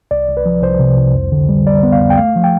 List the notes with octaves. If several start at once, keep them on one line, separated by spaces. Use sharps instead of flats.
C2 D5
C2
B4
F3
C2 C5
C3
C2
F2
D3
G3
G3 D5
B3
F5
F2
G5
A3 F5
F3
G5